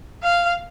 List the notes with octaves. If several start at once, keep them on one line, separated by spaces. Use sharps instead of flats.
F5